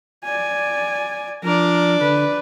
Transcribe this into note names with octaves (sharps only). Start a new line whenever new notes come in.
D5 G#5
F3 D4 A#4 D5
D3 B4